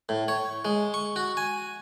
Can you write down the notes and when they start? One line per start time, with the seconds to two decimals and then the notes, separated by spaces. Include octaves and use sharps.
0.09 A2
0.28 C#5
0.65 G#3
0.94 C#6
1.16 F#4
1.37 G#5